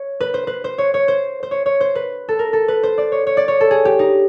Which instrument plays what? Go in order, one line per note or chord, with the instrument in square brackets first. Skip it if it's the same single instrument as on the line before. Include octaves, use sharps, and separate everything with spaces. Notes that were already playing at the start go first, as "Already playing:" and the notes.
Already playing: [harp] C#5
B4
C5
B4
C5
C#5
C#5
C5
C5
C#5
C#5
C5
B4
A4
A#4
A4
B4
C5
D5
C#5
C#5
D5
C#5
A4
G#4
G4
D#4